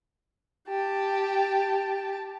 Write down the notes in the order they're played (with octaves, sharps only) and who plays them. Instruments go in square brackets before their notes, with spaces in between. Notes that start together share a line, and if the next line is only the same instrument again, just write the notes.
[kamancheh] G4 A5